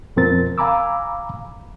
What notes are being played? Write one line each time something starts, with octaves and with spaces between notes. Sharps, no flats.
F2 B2 F3 C4 A#4 A6
F5 G#5 A#5 B5 D6 E6